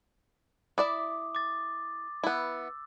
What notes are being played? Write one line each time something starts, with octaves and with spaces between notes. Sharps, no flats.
E4 D5 E5 D6 D#6
D6 A6
B3 E4 E6